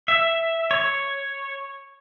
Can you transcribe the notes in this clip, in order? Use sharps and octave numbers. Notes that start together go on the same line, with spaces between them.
E5
C#5